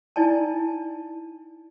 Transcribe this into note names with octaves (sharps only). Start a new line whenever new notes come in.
D#4 E4 D5 G#5 A5